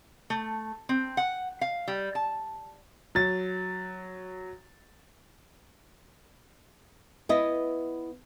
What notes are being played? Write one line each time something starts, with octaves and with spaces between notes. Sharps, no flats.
A3
C4
F#5
F5
G3
A5
F#3 A6
B3 E4 D#5